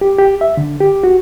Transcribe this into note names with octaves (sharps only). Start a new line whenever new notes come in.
G4
G4
E5
D3
G4
F#4